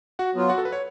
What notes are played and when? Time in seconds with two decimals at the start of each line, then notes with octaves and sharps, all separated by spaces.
0.19 F#4 F#5
0.35 F#3 B3 F4
0.49 F#4 F#5
0.58 A4
0.65 B4
0.72 C#5